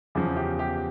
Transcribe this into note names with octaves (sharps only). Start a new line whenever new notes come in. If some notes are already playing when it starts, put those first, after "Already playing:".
E2 C#3 F3
G4
G4